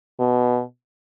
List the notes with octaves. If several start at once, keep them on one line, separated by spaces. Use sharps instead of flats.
B2